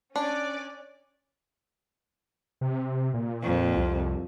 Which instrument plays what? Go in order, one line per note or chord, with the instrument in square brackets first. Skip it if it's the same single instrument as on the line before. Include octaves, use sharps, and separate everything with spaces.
[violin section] C#4 D5 [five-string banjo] D4
[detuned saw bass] C3
A#2
[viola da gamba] F2
[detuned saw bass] C2